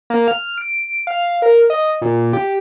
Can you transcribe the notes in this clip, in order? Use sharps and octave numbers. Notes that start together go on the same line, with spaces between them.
A#3
F6
D7
F5
A#4
D#5
A#2
G4